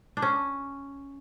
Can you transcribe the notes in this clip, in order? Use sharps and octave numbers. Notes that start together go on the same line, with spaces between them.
D4
C#4